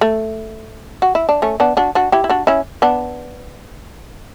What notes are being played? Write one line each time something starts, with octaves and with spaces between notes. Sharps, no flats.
A3
F#4
E4
D4
A3 C#4
B3 D4
D4 F#4
D4 F#4
E4 G4
E4
D4 F#4
C#4 E4
B3 D4